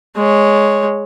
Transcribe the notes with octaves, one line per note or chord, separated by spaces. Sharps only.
G#3 C#5